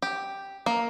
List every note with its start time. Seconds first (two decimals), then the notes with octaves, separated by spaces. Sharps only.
0.02 G4
0.66 A#3